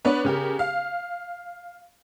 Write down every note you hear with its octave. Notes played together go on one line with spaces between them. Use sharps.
B3 D4 B4 C#5
C#3 G4 A#4
F5